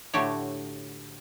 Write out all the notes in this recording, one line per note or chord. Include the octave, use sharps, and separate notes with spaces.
A2 D3 A3 F#4 G4 C#5